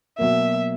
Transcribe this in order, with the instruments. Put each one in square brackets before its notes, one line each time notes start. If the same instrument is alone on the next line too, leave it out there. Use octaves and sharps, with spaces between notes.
[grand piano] B2 F#3 A#3 [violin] E5